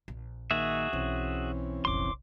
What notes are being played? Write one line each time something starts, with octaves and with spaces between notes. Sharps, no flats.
A#1
D#3 A#3 F#4 G#4 E5
B1 E3 C4 C#4
F1 A#1 C6 D6